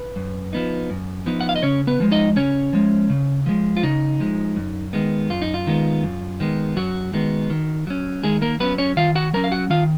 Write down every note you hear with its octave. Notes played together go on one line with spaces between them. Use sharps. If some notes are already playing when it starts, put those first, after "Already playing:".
Already playing: B4
F#2
F3 B3 D#4
F#2
F3 B3 D#4
F#5
F5
D#5
C#3 C#4 C#5
B3 B4
F3 G#3
D#4 D#5
C#3 C#4 C#5
F3 G#3
C#3
F3 G#3
F4
C#3 D#4
F3 G#3
F#2
D#3 G#3 B3
F#2 F4
D#4
F4
D#3 G#3 B3
F#2
D#3 G#3 B3
F#2 F#3 F#4
D#3 G#3 B3
D#3
F#3 C#4
D#3 G#3 G#4
A#3 A#4
F#3 B3 C#4 B4
C#4 C#5
D#3 F4 F5
F#4 F#5
F#3 C#4 A#4 A#5
F5
F#4 F#5
D#3 F4 F5